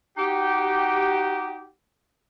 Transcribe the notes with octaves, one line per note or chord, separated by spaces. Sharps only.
D#4 F#4 G4